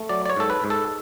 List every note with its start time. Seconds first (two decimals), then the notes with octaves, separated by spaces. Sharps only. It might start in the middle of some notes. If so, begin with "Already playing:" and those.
Already playing: A3
0.09 F#3 D5
0.26 D5
0.30 C#5
0.37 G#2 A4
0.50 B4
0.64 G#2
0.70 A4